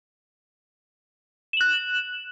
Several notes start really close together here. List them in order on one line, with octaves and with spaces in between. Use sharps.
E7 F#7 F#6